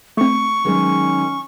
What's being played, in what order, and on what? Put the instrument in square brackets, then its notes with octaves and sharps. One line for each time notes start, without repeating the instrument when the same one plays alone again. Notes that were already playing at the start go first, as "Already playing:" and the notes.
[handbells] A3 C4 [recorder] C#6
[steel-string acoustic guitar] D#3 F#3 G#3 [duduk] C#4